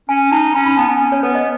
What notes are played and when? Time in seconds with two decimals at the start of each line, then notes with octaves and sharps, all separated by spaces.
0.09 C#4 G#5
0.32 D#4 A5
0.54 C#4 B5
0.66 B5
0.77 B3 A5
0.89 B3 G#5
1.01 C#4
1.12 C#5
1.23 B3 B4
1.35 D#5